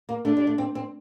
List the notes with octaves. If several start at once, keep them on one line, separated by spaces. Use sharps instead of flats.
A#3
A3 D4
G3
A3
C4
C4